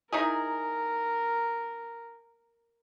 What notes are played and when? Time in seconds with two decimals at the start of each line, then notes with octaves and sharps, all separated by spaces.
0.13 D#4 E4 G#4 A#4